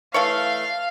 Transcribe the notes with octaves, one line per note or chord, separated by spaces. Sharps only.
E3 A3 C#5 F5